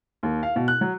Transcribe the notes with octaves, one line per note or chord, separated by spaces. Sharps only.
D#2
F5
B2
F#6
F#3